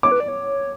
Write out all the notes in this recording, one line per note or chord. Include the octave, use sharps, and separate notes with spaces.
C#5 D6
B4
D5
C#5